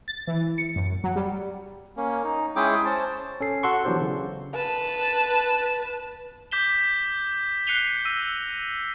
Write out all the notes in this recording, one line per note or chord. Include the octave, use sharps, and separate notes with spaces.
A6
E3
C#7
F#2
F#3
G3
A#3 C#4
D#4
G#3 C#4 E4 G#4 G5 D6
C#4 C5 A5
C#4 A4 C7
F#4 A4 F#5 C6 C#6
E3 F#3 B3 D4 G4 C5
C#3
B4 A5
D6 G6 B6 E7 G7
F#6 C7 C#7 D#7 F7 G7
E6 A#6 D#7